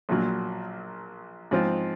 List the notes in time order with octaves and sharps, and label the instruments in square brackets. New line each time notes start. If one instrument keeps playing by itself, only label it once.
[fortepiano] A#1 A#2 F#3
G#2 F3 C4 F4